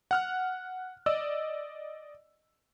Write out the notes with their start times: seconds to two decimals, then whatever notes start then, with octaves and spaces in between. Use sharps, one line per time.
0.11 F#5 F6 F#6
1.06 D5 D#5 E6